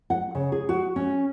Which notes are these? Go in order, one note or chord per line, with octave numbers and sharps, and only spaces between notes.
F#5
C#3
G#4
F#4
C#4